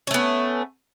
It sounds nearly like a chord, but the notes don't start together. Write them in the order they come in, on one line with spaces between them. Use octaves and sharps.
C#4 A3 B3